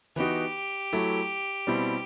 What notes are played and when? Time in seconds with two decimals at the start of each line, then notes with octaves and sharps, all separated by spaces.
0.16 E3 B3 D#4 F#4 G4
0.93 F#3 A3 E4
1.67 B2 G3 C4 E4